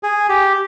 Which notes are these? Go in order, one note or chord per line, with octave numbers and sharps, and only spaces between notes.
G#4
G4